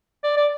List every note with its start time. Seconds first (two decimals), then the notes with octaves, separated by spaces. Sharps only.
0.24 D5
0.37 D5